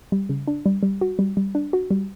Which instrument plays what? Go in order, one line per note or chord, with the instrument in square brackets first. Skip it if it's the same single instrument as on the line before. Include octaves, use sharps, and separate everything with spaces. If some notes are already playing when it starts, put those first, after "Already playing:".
[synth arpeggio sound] G3
C#3
D4
G3
G3
F#4
G3
G3
D4
F#4
G3